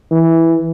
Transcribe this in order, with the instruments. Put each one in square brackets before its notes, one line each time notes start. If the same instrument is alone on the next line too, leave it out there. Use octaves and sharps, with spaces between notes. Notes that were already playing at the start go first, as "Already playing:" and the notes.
[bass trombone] E3